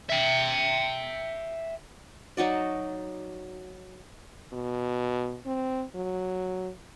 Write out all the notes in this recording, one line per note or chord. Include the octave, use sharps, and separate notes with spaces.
E5 G5
F#3 D#4 F#4 D5
B2
C4
F#3